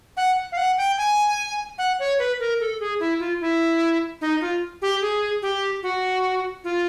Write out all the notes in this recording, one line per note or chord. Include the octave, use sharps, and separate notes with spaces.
F#5
F5
F#5
G5
G#5
F#5
C#5
B4
A#4
A4
G#4
E4
F4
E4
D#4
F4
G4
G#4
G4
F#4
F4